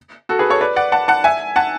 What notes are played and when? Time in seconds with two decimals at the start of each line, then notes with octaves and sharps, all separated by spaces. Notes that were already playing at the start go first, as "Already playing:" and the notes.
0.29 F#4 A4
0.39 G#4 B4
0.50 A4 C#5
0.61 B4 D5
0.76 D5 F#5
0.92 F#5 A5
1.08 F#5 A5
1.24 E5 G#5
1.56 F#5 A5